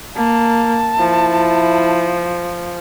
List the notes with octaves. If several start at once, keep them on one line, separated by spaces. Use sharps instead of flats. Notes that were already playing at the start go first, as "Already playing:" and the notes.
A#3 A5
F3 E4